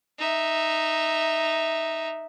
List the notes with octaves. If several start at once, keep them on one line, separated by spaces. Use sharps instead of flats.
D#4 E5